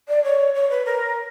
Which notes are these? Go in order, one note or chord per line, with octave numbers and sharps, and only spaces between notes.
D5
C#5
C#5
B4
A#4